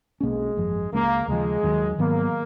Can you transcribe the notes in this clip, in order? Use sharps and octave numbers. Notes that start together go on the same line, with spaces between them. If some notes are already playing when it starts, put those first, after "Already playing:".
B1 B2 G#3 A#3 C#4
G#1 F#2 F3
C#2 C#3 G#3 A#3 C#4
D#2 C#3 F3 G#3
D#2 D#3 F#3
G#2 D#3 F#3 A#3 B3